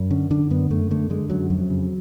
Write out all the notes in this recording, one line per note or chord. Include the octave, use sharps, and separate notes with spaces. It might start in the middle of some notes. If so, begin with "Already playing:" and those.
Already playing: F#2
D3 C#4
D3 D4
F#2 B3
F#2 A3
D3 A3
D3 G#3
F#2 F#3
F2 F#3
C#3